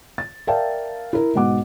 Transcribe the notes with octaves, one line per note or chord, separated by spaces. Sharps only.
A6
A#4 D5 E5 F5 G5 A5
E4 A#4
G#2 B2 F#5 D6